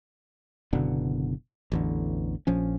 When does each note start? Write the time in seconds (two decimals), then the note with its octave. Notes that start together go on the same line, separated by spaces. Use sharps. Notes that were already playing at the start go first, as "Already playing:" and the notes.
0.73 F#1 B2 D3 B3
1.72 A1 E2 D3
2.47 A#1 F3 C#4